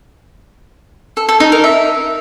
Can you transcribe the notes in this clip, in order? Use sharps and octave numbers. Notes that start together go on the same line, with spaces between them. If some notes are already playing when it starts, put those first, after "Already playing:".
A4
A4
D#4
A#4
E5